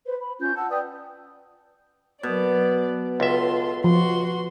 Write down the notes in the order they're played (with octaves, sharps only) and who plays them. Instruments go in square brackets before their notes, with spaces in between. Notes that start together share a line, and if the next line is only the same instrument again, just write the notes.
[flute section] B4 C5
B5
C#4 F4 G6
F#5 A5 E6
B4 D5 G5 D#6
[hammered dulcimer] B2 [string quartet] F#3 D5
[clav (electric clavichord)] C#2 E5 [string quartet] F4 A4 C6
[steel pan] F3 [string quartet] F#4 C6